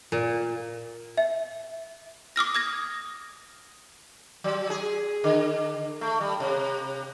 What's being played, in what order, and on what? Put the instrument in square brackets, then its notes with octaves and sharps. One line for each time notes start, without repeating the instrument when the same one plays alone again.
[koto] A#2
[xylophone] E5
D6 D#6 F6 A#6
D#6 G#6 A#6
[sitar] F#3
G#4
D3
A3
G3
C3